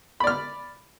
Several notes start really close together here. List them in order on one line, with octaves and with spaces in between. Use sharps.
B5 D5 F6